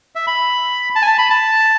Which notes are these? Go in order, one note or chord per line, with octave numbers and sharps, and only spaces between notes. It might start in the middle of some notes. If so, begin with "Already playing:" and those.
E5
B5
A5
G#5
A5
B5
A5